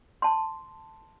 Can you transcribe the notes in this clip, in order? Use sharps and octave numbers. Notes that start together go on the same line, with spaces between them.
A5 C6